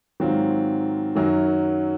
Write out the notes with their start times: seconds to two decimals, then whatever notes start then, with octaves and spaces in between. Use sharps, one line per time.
0.20 G#2 D#3 F#3 C4 F4
1.15 F#2 D#3 F#3